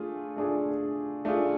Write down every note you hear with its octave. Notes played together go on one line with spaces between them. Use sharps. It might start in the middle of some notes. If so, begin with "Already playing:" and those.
Already playing: A3 D4 F4 G#4
A3 D4 F4 G#4
A3 D4 F4 G#4